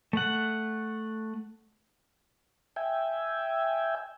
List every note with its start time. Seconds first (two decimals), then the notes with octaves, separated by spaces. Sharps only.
0.13 A3 F#5
2.76 E5 G5 G#5